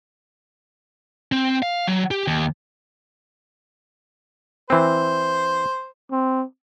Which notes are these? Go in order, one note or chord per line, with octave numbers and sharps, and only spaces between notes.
C4
F5
F#3
G4
D#2
E3 C4 C5
C4